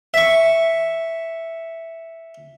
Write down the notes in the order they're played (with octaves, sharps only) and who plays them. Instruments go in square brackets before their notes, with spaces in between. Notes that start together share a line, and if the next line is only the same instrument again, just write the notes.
[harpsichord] E5 C#6